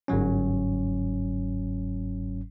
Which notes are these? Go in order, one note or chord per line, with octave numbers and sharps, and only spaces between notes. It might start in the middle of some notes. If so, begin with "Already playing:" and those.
G1 G#2 F#3 C#4